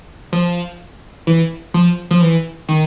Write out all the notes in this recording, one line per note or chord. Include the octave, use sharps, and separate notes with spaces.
F3
E3
F3
F3
E3
D#3